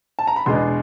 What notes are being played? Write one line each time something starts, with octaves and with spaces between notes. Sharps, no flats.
A5
A#5
B5
E2 B2 G#3 B3 D4 C6